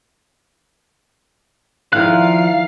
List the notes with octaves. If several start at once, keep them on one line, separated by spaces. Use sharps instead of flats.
D#3 F3 E4 A#4 D5 F5 F#6